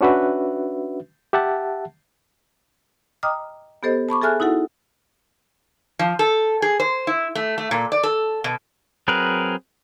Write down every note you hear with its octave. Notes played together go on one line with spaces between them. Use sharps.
C#4 D4 F#4 B4 E5
G4 E5 F#5 A5
D#5 G5 A#5 D6 D#6 F6
B3 G4 A4 C5 D#5
A5 B5 C#6 D6
G#4 A4 E5 G#5 F6 F#6
D#4 E4 F#4 A4 F#5
F3
A4
G#4
C5
E4
A3
A3
A#2
D5
A4
B2
F#3 C4 G#4 A#4 B4